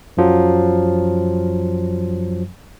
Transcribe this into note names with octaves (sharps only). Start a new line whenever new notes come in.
F#2 F3 F#3